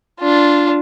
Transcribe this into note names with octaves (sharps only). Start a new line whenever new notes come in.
D4 F4